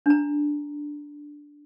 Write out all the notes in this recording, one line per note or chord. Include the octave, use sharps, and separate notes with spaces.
D4 A#5